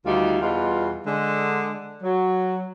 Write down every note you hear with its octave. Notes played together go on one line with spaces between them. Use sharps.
D2 D#3 G3 D#4 F4
E2 B2 G3 F4
D3 G#3
F#3